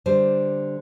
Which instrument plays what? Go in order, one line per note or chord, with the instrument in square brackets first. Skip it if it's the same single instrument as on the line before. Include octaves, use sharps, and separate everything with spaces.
[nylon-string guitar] D3 G3 C5